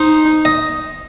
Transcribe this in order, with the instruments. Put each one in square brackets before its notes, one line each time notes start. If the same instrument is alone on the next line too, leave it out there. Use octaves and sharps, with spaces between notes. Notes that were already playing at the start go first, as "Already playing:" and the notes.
Already playing: [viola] D#4 [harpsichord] C5
[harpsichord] D#5